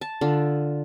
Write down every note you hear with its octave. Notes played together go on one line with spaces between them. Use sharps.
A5
D3 F4